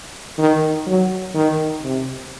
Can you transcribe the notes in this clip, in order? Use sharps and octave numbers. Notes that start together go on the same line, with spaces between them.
D#3
F#3
D#3
C3